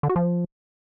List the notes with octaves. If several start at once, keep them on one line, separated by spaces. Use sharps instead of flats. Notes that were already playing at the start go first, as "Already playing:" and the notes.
D3
F#4
F3